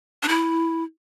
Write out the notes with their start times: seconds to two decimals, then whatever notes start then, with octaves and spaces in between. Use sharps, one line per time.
0.23 D4
0.28 E4